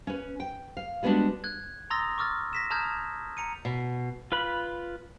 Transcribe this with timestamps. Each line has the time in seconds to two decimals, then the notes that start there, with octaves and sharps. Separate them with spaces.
0.07 C#4 B4
0.40 G5
0.77 F5
1.03 G3 G#3 B3 C#4 D4 F#4
1.44 F#6 G#6
1.90 A#5 C6 D#6 E6 A6 A#6
2.18 C#6 D6 E6 F6 A6
2.53 A#6 B6 E7
2.71 A5 A#5 D#6 F6 G6 G#6
3.37 A#5 C#7 D#7
3.65 B2
4.32 F4 B4 B5